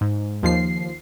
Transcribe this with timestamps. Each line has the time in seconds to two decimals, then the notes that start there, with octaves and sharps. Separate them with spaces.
0.01 G#2
0.43 D#2 F3 C7